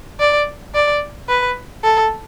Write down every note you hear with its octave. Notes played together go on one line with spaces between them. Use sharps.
D5
D5
B4
A4